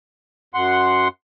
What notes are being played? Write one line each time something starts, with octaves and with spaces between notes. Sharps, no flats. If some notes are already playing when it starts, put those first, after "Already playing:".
F#2 F#5 C6